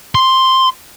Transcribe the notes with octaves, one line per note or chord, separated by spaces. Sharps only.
C6